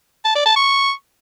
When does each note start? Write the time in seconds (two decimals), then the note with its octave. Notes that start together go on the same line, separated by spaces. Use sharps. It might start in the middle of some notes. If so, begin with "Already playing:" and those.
0.25 A5
0.35 D5
0.46 A5
0.56 C#6